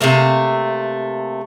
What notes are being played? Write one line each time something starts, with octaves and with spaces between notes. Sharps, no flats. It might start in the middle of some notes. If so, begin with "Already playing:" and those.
C3 F3 A3 A#3